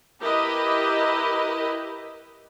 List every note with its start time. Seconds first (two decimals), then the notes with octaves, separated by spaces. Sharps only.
0.20 E4 G4 A#4 B4 D#5